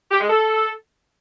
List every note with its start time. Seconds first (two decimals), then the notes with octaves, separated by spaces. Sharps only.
0.11 G4
0.20 G#3
0.30 A4